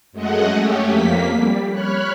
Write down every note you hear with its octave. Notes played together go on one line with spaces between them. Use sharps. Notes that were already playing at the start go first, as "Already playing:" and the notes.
F#2 G#3 A3 D#5 F#5
A3 C#4 G4
F2 A#3 B6
G3
C#5 B5 F6 F#6